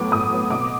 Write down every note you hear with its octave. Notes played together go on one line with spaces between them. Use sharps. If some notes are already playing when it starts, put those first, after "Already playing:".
Already playing: A2 F#3 B3 D6
A2 D#6
F#3 B3
B2 D6